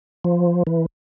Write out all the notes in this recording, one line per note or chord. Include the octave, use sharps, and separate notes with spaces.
F3
E3